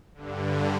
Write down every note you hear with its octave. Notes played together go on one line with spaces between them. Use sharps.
G2 D3